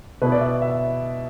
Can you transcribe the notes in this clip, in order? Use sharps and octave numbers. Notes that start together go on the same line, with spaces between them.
B2 B3 E4 B4
D5
E5
E5